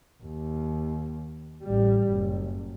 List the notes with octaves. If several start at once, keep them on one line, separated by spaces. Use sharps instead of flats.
D#2
A1 G3
F#1